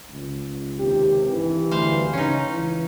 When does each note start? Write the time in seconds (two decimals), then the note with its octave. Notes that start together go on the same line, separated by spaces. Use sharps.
0.11 C#2
0.79 D#2 C3 G4
1.29 C2 G2 E3
1.71 D2 C5 F5
2.13 C#3 C#4 D#4
2.48 C#2 E3